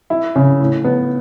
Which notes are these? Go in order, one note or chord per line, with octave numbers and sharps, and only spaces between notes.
E4
C#3
A2
B3